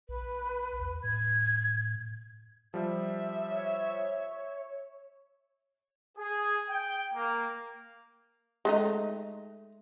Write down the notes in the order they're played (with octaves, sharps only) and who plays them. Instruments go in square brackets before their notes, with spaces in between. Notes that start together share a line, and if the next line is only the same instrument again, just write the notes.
[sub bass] A#1 [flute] B4
[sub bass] E2
[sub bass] A2 [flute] G#6
[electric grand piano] F3 G3 [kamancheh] E5
[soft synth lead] C#5
[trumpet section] G#4
G5
A#3
[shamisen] G#3 A3 D#4